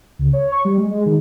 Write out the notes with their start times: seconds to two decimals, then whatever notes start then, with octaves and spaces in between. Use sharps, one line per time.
0.19 C#2
0.33 C#5
0.52 C#6
0.65 G3
0.78 G#3
0.91 G#3
1.06 D#3